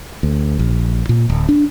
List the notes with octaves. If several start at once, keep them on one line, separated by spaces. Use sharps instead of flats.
D2
A#1
A#2
D1
D4